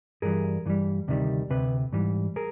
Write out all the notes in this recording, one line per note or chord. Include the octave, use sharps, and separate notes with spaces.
G2 E3 G3 G#4 A#4
G2 E3 G3
D2 C3 D#3 G3
D2 C3 B4
G#2 E3 G3
G#4 A#4